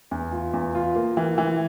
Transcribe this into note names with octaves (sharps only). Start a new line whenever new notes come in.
E2
F4
E2
F4
A#3
E3
E3